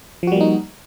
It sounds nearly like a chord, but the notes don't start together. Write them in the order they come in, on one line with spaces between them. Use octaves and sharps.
F3 F#4 G3 A#3 D#4